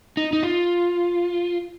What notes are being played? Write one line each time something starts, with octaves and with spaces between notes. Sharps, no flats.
D#4
D#4
F4